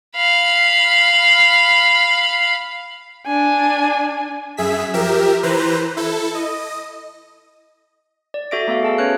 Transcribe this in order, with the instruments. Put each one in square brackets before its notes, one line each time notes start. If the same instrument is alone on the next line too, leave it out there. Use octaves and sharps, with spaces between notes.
[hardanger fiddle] F5 B5
[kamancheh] D4 G#5
[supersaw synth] F#2 G#4 E5 B6
F3 G4 A#4 E5
E3 B4 C5 A#5
E4 A4
D#5
[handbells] D5
F#4 A4 E5 D6 A#6 D7
A3 B3 A4 F5
G#4 A5 E6
C#4 B4 C#5 F6 F#6